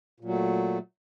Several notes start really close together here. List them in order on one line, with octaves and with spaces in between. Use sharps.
A#2 F#3 A3